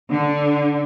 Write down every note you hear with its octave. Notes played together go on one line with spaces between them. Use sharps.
D3